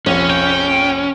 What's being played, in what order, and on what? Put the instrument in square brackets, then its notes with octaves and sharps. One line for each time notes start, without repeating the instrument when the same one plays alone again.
[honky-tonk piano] F1 A#1 [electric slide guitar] C#4
[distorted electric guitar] G5